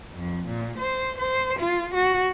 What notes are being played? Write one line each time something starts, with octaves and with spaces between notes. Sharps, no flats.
F2
A#2
C5
C5
F4
F#4